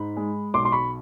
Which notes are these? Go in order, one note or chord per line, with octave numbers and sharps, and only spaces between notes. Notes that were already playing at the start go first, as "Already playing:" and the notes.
Already playing: G#2 B5
G#3
B1 C6 D6
C6
B5 C#6